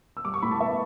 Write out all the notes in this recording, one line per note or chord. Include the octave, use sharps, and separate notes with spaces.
E6
G3 D6
C#6
A2 B5
A5
B3 E5